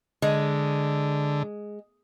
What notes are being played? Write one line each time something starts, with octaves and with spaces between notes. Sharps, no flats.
D3 G#3